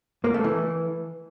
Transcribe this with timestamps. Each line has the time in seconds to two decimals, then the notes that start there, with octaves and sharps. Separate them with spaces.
0.24 A#3
0.34 A3
0.44 E3